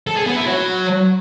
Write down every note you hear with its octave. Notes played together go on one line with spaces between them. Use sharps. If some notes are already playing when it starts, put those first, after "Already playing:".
A4
G#4
B3
E4
F#3